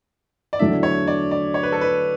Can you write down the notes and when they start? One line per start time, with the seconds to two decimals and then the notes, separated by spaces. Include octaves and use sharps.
0.53 D5
0.59 E2 D3 F#3 A3 D4 E5
0.83 C#5
1.07 D5
1.31 D5
1.54 C#5
1.63 B4
1.72 A4
1.81 B4